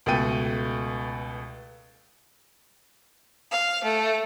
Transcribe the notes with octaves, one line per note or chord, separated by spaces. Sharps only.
C#2 B2 A3 A4 G5 D#7
F5
A3